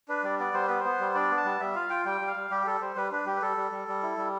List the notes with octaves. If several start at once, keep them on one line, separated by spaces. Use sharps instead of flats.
D4 B4
G3 D5
B3 D5
G3 C5
B3 B4
C5
B3
G3
D4 D5
B3
A5
G3
G3 E5
F4 F5
F4 G5
G3 G5
G3
F5
G3
G3 G4
G3 A4
G3 C5
G3 B4
D4 B4
G3 G4
B4
G3 A4
G3
G3
G3
E4
G3